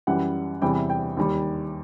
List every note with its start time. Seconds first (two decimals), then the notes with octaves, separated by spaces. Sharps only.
0.07 F#2 E3 G3 F#5
0.62 E2 C3 E3 G3 G5
0.90 G5
1.17 D#2 D#3 G3